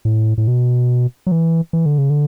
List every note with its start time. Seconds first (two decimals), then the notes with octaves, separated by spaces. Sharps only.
0.05 A2
0.38 A2
0.48 B2
1.27 F#3
1.32 E3
1.73 E3
1.86 D3
1.98 C#3
2.10 D3